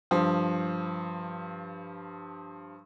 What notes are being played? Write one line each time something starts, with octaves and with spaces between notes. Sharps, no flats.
G2 F3